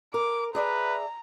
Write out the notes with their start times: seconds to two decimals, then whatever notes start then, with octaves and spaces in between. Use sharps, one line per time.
0.14 A#4 D6
0.55 G#4 B4 D5 E5 A#5